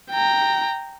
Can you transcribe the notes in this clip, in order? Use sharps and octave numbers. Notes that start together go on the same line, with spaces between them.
G5 A#5